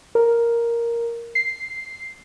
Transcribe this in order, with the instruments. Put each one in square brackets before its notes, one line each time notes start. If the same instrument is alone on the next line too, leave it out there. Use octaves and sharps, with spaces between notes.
[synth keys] A#4
C7